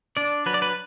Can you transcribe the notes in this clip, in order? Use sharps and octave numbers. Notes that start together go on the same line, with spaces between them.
D4 D5
F#3 B4
D5
B4